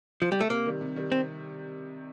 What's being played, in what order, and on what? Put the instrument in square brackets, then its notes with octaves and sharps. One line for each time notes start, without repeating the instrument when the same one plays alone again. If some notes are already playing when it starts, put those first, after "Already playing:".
[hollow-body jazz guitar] F3
G3
A3
[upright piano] C3 [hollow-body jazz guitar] A#3
[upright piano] D#3 G3
C3
D#3 G3
[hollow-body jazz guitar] C4